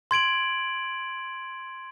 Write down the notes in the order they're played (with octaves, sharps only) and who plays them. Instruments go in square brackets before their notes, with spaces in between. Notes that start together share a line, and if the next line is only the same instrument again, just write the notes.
[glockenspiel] C6 G#6 D7 F#7